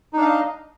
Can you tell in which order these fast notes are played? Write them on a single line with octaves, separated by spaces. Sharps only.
D#4 D4 F5 D#5